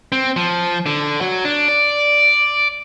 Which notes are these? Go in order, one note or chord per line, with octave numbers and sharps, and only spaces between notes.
C4
F3
D3
F#3
D4
D5